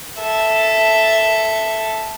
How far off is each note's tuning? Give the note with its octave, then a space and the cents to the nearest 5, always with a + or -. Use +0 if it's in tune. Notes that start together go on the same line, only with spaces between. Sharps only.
A4 +0 E5 +0